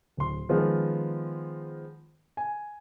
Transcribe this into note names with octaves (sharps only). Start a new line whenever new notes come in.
D1 C6
D#3 F3 G#3 B3
G#5